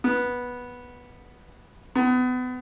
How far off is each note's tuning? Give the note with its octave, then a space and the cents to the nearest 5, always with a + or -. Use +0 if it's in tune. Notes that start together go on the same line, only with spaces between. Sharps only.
B3 -10
B3 +30